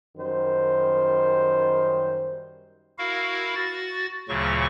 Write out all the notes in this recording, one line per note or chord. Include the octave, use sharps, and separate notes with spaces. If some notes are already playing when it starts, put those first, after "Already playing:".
F#2 D#3 G3 C5
E4 F#4 A#4 F5
F#4 A6
D2 A#2 C#3 F#3 C#6